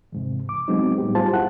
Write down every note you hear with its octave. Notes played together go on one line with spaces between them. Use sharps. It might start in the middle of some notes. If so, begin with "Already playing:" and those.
E2 G#2 C3
D6
F#3 G#3 B3 C4 D#4
A2 G3 B3 G4
F4 G#4 C5 A5
F#2 E4 F#5 F#6